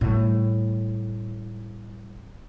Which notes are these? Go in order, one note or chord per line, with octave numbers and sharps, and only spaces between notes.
A2 G3